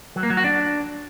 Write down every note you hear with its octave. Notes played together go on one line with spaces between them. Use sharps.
F#3
A#3
F#3
F#4
D4